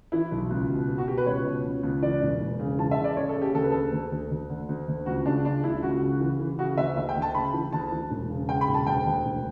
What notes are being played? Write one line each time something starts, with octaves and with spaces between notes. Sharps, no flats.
E3 E4
B1
C#2
B2
B2
F#4
B2 G4
B4
C#2 C#5
B2
C#2
C#2
E3 D5
E1
E1
C#3
E3 A5
E5
C#3
D5
C#3 C#5
A4
C#3
G4
D2 A4
B4
D2 A4
D2
D2
D2
D3
D2
D2
C#2 F#4
C#3 D4
C#2 D4
C#2 E4
C#2 F#4
C#3
E3
E3
C#3 F#4
D2 E5
D2 E5
G5
D2
A5
C#3 B5
E3
D2 A5
E3
E1
C#3
C#3 G5
B5
E1
A5
D2 G5
D2
E1